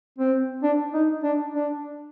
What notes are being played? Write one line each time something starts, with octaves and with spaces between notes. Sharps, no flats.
C4
D4
D#4
D4
D4